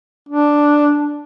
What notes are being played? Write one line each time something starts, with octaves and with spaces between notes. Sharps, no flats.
D4